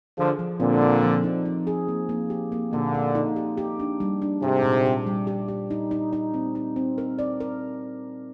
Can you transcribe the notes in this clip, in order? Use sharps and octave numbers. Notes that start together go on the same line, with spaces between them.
D3 F3 G#4
F3
A#2 D3 C4
C4
F3
D#4
D#4
G#4
A#3
A#3
G4
A#3
A#2 D3 A#3
A#3
D#4
G4
G4
D4
G3
D4
G#2 C3 G4
A#2
G4
G3
G4
G4
D#4
D#4
D#4
C4
D#4
C4
A#4
D5
A#4